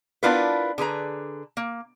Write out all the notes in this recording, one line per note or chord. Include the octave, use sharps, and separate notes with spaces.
B3 D4 E4 F4 A#4 B4
D3 G#4 B4 A#5
A#3